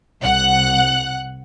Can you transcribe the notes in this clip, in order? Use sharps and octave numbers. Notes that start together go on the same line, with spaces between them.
C2 F#5 F#6